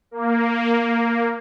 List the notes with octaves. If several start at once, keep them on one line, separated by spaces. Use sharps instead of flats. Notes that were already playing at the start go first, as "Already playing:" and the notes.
A#3